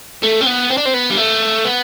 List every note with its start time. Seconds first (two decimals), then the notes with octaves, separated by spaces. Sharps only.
0.23 A3
0.41 C4
0.46 B3
0.70 C4
0.77 D4
0.85 C4
0.94 B3
1.10 G3
1.17 A3
1.65 B3